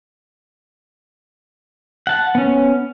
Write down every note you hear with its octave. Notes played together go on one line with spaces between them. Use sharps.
F#5 A5
B3 C#4